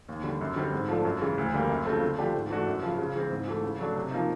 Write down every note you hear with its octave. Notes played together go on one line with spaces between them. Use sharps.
D#2
D3 G3
F#2
D3 G3 C4
G#2
F3 A3 D4
F#2
C#3 E3 G#3
D2
D3 G3 A#3
F#2
C#3 F3 A3 C4
D3
F3 A3 D4 G4
G#2
E3 A3 D4 F#4
F#2
C#3 F3
C#3
E3 G#3 C4
G#2
E3 A3
C#3
F#3 A3 D4
C3
F3 A#3 D#4